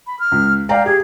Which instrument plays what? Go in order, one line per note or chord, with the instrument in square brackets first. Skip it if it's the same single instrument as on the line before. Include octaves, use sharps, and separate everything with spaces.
[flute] B5
F6
[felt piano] C#2
[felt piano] D5 G5 A#5 [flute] F5
[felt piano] G4 [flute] G#4